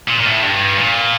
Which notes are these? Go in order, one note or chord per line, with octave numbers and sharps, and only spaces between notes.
A#2
A#2
A2
G2
A#2